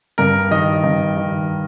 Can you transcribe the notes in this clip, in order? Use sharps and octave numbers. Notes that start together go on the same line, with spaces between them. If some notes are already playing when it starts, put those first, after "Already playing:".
G2 A#4
D#3 D#5
G2
D#3